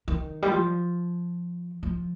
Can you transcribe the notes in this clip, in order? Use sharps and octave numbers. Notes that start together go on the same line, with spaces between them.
D#3
G3
F3
F3